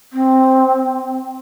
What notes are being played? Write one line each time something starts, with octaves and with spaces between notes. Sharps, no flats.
C4